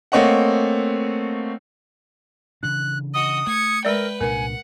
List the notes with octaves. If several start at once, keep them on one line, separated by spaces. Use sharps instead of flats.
A3 A#3 C4 C#5 D#5 F#5
C#3 E3 D4 F#6
F#4 D#5 D#6
A3 G#6 C#7
G#3 A#4 B4 D5 G5
C2 A#2 D4 A#4 F#5 G#5